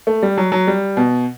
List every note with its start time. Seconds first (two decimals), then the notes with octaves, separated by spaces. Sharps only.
0.07 A3
0.23 G3
0.38 F#3
0.52 F#3
0.67 G3
0.97 B2